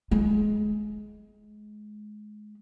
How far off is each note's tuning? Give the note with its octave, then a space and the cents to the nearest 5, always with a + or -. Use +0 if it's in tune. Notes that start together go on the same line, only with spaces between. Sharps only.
G#3 +25